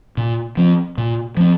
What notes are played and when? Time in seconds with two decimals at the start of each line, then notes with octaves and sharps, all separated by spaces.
0.17 A#2
0.57 F3 C4
0.98 A#2
1.37 F3 C4